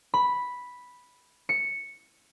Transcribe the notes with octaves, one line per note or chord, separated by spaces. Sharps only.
B5
C#7